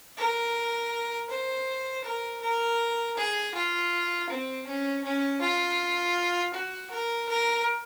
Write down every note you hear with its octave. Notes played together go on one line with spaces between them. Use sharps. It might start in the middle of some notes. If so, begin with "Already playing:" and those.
A#4
C5
A#4
A#4
G#4
F4
C4
C#4
C#4
F4
F#4
A#4
A#4